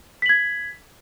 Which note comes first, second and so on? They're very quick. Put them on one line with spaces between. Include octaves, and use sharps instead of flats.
B6 F#7 G#6